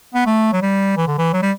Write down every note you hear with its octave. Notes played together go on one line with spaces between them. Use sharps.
B3
A3
F#3
G3
E3
D3
E3
F#3
G3